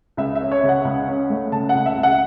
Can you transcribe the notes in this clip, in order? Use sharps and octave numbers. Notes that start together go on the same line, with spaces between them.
C#2 E5
E5
C#4
C#5
C#3
F#5
C#2
C#4
A3
C#3 A5
F#5
C#2
E5
C#2
F#5